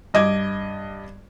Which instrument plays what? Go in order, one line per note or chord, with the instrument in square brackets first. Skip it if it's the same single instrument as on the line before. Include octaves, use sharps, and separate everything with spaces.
[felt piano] G2 D#5 D6 G#6